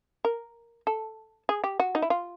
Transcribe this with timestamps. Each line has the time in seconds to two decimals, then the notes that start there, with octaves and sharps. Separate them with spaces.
0.25 A#4
0.87 A4
1.49 G#4
1.64 G4
1.80 F#4
1.95 D#4
2.02 E4
2.10 F4